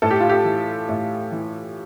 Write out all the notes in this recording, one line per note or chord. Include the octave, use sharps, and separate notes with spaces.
A2 A4
G4
F4
G4
E3
A2
E3